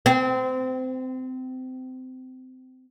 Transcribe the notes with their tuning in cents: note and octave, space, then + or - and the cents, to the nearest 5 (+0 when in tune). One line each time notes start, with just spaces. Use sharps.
C4 -25